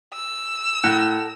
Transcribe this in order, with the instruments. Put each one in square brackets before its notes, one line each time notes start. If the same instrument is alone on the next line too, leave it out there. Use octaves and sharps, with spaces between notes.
[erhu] E6
[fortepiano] A2 [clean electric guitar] A4 A#4 F#5